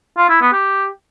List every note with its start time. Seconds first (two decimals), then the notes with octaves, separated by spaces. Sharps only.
0.17 F4
0.29 E4
0.41 B3
0.53 G4